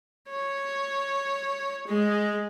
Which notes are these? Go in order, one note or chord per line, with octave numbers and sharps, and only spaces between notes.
C#5
G#3